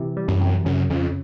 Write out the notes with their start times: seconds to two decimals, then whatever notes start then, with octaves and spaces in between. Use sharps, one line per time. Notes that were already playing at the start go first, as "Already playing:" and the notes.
Already playing: C3 E3
0.17 G3
0.28 F#2
0.41 C3
0.65 F#2 C#3
0.90 F2 C#3